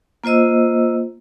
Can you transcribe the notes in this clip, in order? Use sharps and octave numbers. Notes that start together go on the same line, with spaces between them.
A#3 F4 C5 D#5 E6